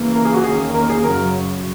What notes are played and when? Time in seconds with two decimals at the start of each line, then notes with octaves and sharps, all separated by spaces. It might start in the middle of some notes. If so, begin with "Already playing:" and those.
Already playing: E2 C#3 E3 A#3
0.15 A#4
0.25 G#4
0.34 F#4
0.44 E2 D#3 A#3 C#4 G#4
0.74 A#4
0.89 G#4
1.04 F#2 C#3 F#3 A#4